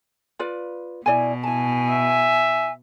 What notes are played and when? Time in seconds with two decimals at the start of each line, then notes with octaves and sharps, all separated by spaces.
0.39 F4 B4 D5
1.06 B2 E4 D5 G#5
1.43 E4 G#5 A5
1.91 E5